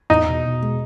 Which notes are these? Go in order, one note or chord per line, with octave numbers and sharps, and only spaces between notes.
E2 D#4
B2
B2
G#3